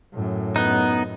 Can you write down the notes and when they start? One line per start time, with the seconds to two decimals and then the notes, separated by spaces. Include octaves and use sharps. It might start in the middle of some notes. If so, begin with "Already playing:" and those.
0.13 F#2 A2
0.56 B3 D#4